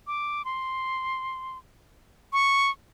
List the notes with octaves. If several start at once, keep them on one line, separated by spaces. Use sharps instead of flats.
D6
C6
C#6